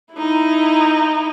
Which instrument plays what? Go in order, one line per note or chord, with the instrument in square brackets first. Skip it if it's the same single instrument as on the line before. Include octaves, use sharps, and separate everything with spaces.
[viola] D#4 E4